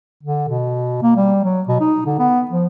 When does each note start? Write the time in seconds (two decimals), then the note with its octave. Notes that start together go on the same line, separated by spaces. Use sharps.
0.23 D3
0.49 B2
1.02 A#3
1.16 G3
1.44 F#3
1.68 B2
1.80 D#4
2.06 D3
2.19 B3
2.51 F3